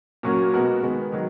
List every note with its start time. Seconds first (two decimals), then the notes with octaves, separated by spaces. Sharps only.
0.23 A#2 F#3 C#4 F#4 A#4
0.53 B2 G#3 B3 F#4 A#4
0.83 D#3 G#3 B3
1.12 D#3 F#3